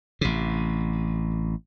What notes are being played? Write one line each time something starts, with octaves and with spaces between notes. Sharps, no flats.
A1 C3